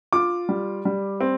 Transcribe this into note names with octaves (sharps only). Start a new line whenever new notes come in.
F4 D6
G3
G3
C4